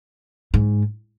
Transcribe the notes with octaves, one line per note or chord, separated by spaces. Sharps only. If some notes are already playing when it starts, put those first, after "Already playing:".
G#2